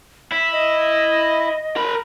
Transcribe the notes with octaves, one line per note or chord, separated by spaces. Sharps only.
E4 B6
D#5
A#4 B5